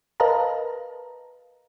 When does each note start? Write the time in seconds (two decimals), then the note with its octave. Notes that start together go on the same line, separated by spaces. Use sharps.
0.20 A#4 B4 D#5 F5 A5 A#5